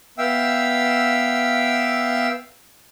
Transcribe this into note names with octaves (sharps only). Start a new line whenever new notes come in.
B3 E5 F5 G5 E6